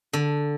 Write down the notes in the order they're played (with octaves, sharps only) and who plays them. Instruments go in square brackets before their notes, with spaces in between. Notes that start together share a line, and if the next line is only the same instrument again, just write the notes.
[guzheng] D3